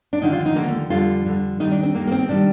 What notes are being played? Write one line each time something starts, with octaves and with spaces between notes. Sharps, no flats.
D4
D#2 D3 F3 D#4
F4
D#4
D#2 D3 F3 A#3
A3
F2 D3 G3 F4
F2 D3 G3
D#2 D#3 G3 D#4
D4
C4
D#2 D#3 G3 A#3
A#3
C4
C3 D#3 G3 D4